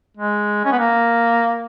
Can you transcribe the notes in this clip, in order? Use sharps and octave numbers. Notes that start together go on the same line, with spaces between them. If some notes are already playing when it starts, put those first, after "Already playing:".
G#3
C#4
B3
A#3